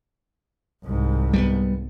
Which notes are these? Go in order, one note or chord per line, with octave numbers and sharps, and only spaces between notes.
C2 G#2
G3 G#3 B3